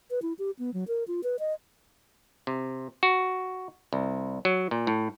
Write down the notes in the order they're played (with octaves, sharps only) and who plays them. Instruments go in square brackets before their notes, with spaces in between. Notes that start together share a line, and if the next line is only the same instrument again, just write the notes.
[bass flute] B4
E4
G4
B3
F#3
A#4
F4
B4
D#5
[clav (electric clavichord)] C3
F#4
C2
F#3
A#2
A2